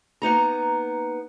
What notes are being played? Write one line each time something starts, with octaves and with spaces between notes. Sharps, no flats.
A#3 B3 D#4 A#5